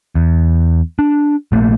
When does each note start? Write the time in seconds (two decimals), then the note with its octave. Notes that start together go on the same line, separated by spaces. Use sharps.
0.15 E2
0.99 D4
1.52 A#1 A3 A#3